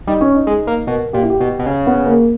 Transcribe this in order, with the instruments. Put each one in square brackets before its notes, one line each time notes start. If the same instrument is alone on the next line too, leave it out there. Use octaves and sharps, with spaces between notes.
[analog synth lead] G3 [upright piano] D#4
[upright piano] C#4
D#4
[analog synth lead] G#3
A#3
[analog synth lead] B2 [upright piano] A#4
[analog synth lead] A#2 [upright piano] G4
[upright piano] E4
G4
[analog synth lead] B2 [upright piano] G4
[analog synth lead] B2
C#3
[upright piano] B3
A#3